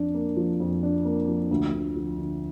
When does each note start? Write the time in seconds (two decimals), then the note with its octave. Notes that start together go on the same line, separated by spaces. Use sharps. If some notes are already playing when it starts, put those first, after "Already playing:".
Already playing: F2 D4
0.14 A#3
0.37 F3
0.60 F2
0.83 D4
1.05 A#3
1.28 F3
1.51 D2
1.73 D2
1.96 F3
2.18 D3